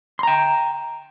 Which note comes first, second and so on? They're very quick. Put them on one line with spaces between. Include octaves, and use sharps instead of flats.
C6 A#5 G5